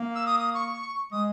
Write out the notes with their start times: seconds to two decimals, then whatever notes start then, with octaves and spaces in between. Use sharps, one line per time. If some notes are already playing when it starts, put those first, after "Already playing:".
Already playing: A#3
0.15 E6
0.26 D#6
0.39 D#6
0.54 C#6
1.12 G#3 D#6